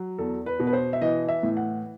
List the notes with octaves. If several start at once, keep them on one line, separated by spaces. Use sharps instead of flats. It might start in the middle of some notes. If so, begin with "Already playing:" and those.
Already playing: F#3
E2 A4
B4
B2
B4
C5
E5
E3 D#5
E5
A2
F#5